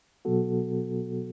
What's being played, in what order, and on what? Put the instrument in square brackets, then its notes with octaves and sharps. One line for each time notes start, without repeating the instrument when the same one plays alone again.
[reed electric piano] B2 F#3 B3 F#4 A4